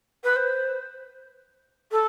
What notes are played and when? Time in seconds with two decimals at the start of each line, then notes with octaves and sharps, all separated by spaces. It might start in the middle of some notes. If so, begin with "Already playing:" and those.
0.24 B4
0.36 C5
1.91 A4